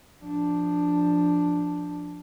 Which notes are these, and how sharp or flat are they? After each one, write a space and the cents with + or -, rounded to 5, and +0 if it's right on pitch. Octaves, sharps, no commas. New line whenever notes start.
F3 +0 D4 +0